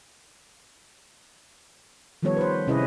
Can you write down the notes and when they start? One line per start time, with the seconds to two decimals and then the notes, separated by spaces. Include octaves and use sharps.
2.22 D#3 F3 G3 B3 A4 C#5
2.37 B4 C5
2.67 C3 C#4 E4 G#4 B4 D#5